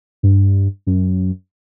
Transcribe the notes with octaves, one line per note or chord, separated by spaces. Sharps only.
G2
F#2